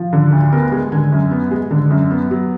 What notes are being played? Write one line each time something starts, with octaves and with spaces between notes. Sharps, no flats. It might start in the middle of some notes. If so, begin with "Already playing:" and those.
Already playing: F3
D3
D2
B3 A#4
G#3
D3 G#5
F#2
B3
G#3
D3
F#2
B3
F#3